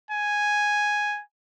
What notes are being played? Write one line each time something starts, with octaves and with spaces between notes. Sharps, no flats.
G#5